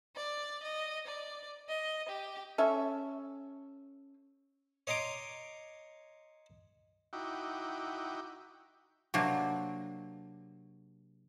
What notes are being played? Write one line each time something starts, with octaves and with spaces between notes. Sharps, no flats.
D5
D#5
D5
D#5
G4
C#4 A4 E5
C#5 D#5 A#5 C6 D6
D#4 E4 F#4 G5 D6
C3 F#3 A#3 D4